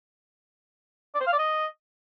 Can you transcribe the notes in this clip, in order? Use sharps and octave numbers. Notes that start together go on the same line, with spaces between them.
D5
C5
F5
D5
D#5